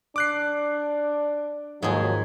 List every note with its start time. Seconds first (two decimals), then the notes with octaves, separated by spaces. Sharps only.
0.16 D4 D6 F#6 C7
1.82 D#2 G#2 F3 F#3 G#4